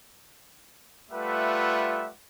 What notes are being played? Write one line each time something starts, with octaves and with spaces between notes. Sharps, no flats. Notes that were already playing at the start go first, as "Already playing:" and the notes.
G3 A3 F4 B4 E5 F#5